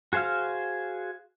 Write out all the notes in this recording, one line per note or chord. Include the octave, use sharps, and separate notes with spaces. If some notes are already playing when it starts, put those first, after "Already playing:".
F#4 G#4 C5 F5 F6